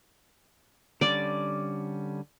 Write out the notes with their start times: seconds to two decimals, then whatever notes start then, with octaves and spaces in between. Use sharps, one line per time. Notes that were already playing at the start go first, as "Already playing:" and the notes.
1.01 D3 G3 C#4 D5